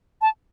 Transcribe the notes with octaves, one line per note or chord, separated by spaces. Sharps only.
A5